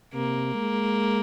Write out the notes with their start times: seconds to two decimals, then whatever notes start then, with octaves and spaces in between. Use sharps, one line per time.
0.14 C3 A#3
0.55 G#3